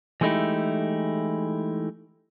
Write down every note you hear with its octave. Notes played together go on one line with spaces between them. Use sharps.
E3 G#3 A3 D#4 E4 G4